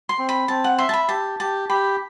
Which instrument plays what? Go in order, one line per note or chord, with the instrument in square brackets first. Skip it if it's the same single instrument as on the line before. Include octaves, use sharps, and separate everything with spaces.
[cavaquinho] C6
[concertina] C4
[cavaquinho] B5
[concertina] C4 [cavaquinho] A5
[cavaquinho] F#5
[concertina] E5 [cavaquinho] C6
[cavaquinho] A5
B5
[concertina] G4 [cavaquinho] A5
[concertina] G4 [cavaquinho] A5
[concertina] G4 [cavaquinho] B5